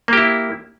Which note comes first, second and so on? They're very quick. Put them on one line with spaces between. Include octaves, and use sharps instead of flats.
A#3 G4 E4